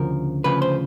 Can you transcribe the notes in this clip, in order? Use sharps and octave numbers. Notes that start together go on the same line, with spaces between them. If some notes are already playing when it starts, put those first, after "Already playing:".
Already playing: D2 C#3 F3 A#4
D2 C#3 F3 B4
C5